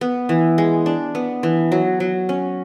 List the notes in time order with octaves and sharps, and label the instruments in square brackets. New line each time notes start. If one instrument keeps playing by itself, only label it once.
[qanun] B3
E3
G#3
D4
B3
E3
F#3
F#3
C#4